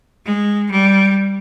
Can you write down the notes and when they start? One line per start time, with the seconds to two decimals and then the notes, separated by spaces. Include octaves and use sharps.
0.25 G#3
0.71 G3